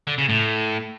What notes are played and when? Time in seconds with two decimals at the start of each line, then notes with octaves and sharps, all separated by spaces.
0.07 D3
0.18 C#3
0.29 A2